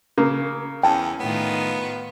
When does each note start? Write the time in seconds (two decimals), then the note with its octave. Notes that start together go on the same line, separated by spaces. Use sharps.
0.18 C#3 A#3
0.83 E2 C#4 G5 A5
1.20 A2 D#3 B3 F4